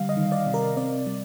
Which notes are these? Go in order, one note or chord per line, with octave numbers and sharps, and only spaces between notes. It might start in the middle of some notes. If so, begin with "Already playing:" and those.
Already playing: D3 G3 F5
D#5
D#3
D5
C3
A#4
C4 D5
G3